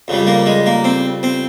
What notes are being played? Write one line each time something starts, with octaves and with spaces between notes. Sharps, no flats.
F2 C#3 G3
A#3
G#3
A#3
C4
C4